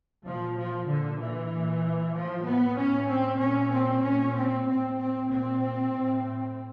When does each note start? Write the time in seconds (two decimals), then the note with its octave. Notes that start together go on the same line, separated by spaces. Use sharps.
0.25 A#2 F3
0.57 F3
0.88 A#2 D3
1.19 E3
1.51 A#2
2.14 A2 F3
2.45 B3
2.77 A2 C#4
3.08 C4
3.39 A#2 C#4
3.71 C4
4.03 A#2 C#4
4.34 C4
4.66 A2 C4
4.98 C4
5.29 A#2 C4
5.92 A2